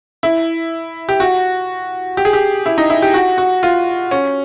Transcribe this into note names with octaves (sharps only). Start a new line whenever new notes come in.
E4
G4
F#4
G4
G#4
G4
E4
D#4
E4
G4
F#4
F#4
F4
C#4